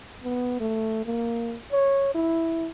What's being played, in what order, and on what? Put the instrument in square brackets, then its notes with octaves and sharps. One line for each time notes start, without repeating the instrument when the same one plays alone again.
[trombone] B3
A3
A#3
C#5
E4